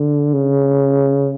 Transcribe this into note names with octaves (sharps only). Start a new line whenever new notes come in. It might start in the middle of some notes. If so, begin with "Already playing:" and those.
Already playing: D3
C#3